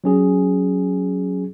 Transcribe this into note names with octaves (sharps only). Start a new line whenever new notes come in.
F#3 C#4 G#4